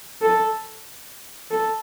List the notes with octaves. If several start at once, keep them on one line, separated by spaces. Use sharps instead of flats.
A4
A4